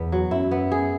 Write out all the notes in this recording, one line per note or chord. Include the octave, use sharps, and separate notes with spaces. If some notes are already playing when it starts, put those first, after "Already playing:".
Already playing: E2 B3
F#3
F#2 E4
B3
G#4